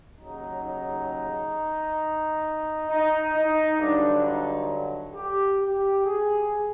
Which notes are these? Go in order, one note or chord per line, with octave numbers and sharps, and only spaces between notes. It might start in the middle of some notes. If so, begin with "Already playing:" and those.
D#2 C#3 F#3 D#4
D#4
D#4
D#4
G2 D3 F#3 D4
D#4
G4
G4
G#4